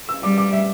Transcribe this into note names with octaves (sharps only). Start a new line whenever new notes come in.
E6
G3 D6
D6
E5